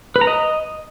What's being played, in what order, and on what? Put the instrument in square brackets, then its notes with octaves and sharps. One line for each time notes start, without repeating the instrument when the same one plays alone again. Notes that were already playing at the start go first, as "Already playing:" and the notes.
[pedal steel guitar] B4
A#5
D#5